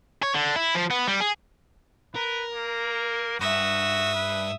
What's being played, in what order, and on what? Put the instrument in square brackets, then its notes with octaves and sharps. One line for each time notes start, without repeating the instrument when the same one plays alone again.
[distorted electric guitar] C#5
D3
E4
F3
B3
G3
G#4
[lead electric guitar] A#4 [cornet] B4
[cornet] A#3
[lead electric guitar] G2 [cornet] F#4 [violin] E5 D#6
[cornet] B4